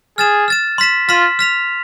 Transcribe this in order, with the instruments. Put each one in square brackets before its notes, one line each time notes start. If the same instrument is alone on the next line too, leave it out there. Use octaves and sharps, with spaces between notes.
[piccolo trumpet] G#4 [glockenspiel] F6 A6 E7
[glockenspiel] F6 A6 E7
C6 F6 B6 E7
[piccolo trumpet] F4 [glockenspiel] C6 F6 B6 E7
[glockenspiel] F6 B6 F7